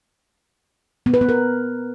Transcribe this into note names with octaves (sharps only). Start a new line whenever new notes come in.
B3
B4
B3
A#4